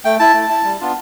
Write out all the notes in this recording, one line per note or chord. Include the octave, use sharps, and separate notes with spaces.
A3 G5
E4 A5
A3
E4
G3
B3 D4 F4